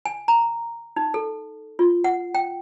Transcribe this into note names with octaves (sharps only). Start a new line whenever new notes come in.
G#5
A#5
D#4
A4
F4
F#5
G5